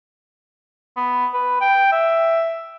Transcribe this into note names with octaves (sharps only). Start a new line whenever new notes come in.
B3
B4
G5
E5